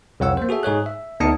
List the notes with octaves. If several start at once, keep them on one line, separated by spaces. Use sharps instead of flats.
C2 F2 C#5 F#5 E6
A#3 C5
F#4 G#4 A4 E5
G#2 G#4 C#5 F#6
E5
D2 B3 D#4 A5 D#6 C#7